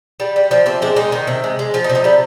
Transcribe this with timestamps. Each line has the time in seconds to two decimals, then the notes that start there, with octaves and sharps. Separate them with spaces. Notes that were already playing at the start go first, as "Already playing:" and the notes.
0.20 G3
0.36 G3
0.51 F3 C4
0.66 C3 C4
0.82 G#3 D4
0.96 G#3 D#4
1.12 D#3
1.27 C3
1.44 G#3
1.59 G#3
1.74 F3 F4
1.84 D#4
1.89 C3
1.95 D#4
2.04 G3 F4